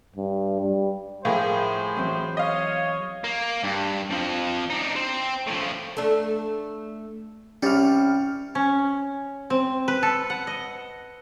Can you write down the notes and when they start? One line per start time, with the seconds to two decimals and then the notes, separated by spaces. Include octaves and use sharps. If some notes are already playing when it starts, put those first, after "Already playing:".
0.16 G2
0.62 G3
1.25 A2 F3 G#4 A#4 C5 F5
1.96 E2 F#3 C4
2.37 C#5 D#5 F5
3.24 A#3
3.64 G2
4.10 F2 F3
4.70 D4 D#4
4.96 C4
5.47 A2 F3
5.97 A3 D4
7.63 C2 G3 C#4 F6
8.55 C#4
9.50 C4
9.88 B4
10.03 A4
10.30 F#5
10.47 D#5